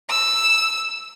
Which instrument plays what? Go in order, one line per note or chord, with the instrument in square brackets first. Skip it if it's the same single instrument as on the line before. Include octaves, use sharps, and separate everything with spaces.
[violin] E6